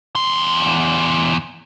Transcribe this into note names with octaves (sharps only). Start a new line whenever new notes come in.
E2 C6